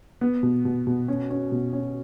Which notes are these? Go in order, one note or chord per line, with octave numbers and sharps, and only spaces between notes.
B3
B2
B2
B2
C#4
C#4
B2
C#4